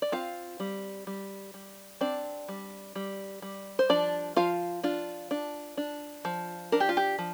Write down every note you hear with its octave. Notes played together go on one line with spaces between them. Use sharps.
D5
C4 F4 F5
G3
G3
G3
C4 D4 D5
G3
G3
G3
C5
F3 D4 D5
F3 F4 F5
D4 F4
D4
D4
F3
D4 A#4
G4
F4
G4
F3